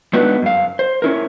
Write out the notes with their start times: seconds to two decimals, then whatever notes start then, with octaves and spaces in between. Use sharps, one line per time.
0.13 G#3 B3 D4 D#4 F#4 B4
0.42 F#2 F5
0.79 C5
1.02 C#4 E4 A#4